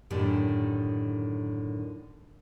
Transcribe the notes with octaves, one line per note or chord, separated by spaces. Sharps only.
F#2 A2 D3 D#3 G4